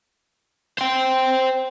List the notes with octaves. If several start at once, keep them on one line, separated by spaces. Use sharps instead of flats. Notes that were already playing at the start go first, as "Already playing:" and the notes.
C5 G5